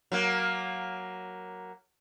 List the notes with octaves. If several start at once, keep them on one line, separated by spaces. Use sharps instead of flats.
F#3 A#3